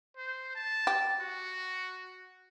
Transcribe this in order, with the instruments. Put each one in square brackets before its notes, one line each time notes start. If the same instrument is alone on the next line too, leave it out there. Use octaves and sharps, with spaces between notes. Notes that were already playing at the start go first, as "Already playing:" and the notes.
[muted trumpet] C5
A5
[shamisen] G4
[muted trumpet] F#4